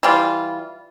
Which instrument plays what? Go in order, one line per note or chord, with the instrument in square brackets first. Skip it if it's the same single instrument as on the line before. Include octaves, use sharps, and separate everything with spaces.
[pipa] E3 G3 F4